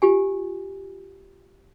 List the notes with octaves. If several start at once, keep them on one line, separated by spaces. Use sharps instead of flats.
F4 G4 G#5